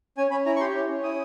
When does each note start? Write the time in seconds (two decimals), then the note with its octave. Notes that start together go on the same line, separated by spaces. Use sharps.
0.17 C#4 G#5
0.31 C#4 B5
0.46 E4 A#5
0.56 C#6
0.60 G4 C6
0.74 C#4
0.90 C#4
1.03 E4 D#6